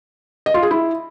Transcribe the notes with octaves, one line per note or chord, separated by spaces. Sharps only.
D#5
F4
G#4
E4